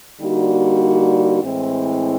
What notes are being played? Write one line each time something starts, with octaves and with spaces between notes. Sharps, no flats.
D3 G3 A#3 D#4 F#4
A2 E3 G#3 C4